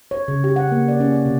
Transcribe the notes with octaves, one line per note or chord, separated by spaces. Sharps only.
C#5
C#3
G4
F#5
A#3
D5
C#4
D5
C3